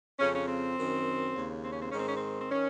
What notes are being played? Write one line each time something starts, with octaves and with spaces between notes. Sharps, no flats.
F2 C#3 C#4
C#4
C4
F#2 D#3
D#2 C#3
C4
C#4
C4
G#2 D#3 C#4
C4
C#4
C4
C4
D#3 C#4